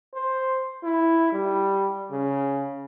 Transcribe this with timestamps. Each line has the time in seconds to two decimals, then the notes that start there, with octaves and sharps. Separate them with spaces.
0.14 C5
0.84 E4
1.33 G3
2.12 C#3